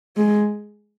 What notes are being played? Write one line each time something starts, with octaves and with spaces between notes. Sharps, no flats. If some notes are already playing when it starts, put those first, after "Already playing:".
G#3